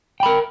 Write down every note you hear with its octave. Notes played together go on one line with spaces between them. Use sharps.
A#4 G5 B5